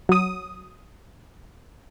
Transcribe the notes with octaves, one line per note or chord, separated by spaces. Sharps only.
F#3 D#6